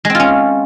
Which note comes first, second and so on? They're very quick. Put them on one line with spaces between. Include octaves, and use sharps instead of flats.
G#3 C4 F4 C#4